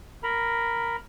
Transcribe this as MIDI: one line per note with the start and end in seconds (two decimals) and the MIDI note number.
0.23 0.96 70
0.23 0.96 82
0.23 0.96 83